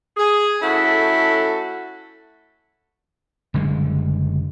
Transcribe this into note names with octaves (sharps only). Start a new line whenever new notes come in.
G#4
A3 C#4 E4 F#4 A4
F#1 D3 G3 G#3